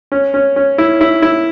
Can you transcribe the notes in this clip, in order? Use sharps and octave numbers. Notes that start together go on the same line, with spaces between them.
C#4
C#4
C#4
E4
E4
E4